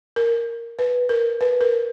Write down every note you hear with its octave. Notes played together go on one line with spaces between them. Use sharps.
A#4
B4
A#4
B4
A#4